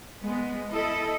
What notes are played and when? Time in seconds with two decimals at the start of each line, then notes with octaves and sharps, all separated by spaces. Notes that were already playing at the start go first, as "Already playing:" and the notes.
0.23 G#3 B3
0.71 E4 A4 D#5